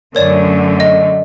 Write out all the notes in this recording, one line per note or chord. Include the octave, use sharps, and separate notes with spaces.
F#2 D3 A3 A#4 C#5 D5
D#5